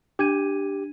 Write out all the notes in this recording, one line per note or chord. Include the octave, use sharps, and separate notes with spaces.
D4 G4 G#6 D#7